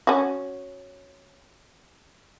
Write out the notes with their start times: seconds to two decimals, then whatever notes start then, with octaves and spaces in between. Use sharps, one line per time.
0.07 C#4 F#4